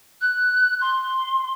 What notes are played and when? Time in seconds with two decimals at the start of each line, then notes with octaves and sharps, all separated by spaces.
0.21 F#6
0.81 C6